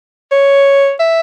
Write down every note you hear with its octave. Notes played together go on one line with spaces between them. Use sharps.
C#5
E5